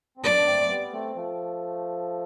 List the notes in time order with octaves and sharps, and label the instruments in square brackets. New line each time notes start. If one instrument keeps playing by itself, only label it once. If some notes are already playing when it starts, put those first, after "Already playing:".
[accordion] C4
[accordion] B3 D4 [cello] D5
[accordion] A3 C4
G3 B3
A3 C4
F3 A3